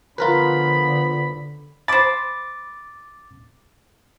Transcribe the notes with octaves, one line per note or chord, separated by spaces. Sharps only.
D3 F3 B3 F4 A#4 B4 B5
C5 B5 D6 A6